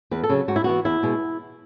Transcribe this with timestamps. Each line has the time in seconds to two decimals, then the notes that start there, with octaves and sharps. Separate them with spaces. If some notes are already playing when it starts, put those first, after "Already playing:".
0.11 E2 B4
0.23 A4
0.29 C#3 F#3
0.48 G#2 F#4
0.56 E4
0.64 E3 B3 F#4
0.85 E2 E4
1.03 B2 G#3